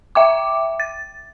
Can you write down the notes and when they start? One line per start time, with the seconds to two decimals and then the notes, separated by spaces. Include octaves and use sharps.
0.15 E5 G5 D6
0.80 A6